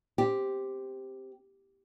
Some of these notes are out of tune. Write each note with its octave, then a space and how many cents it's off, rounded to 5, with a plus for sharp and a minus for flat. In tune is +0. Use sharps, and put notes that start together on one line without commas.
C4 +0 G4 +0